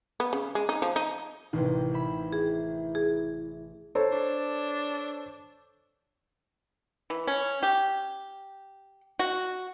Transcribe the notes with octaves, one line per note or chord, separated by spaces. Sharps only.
B3
C#3
G#3
D#4
F3
D#4
A1 C3 D#3 E3
E5 B5
E4 G#4
G#4
A4 C5 C#5
D4
E3
C#4
G4
F#4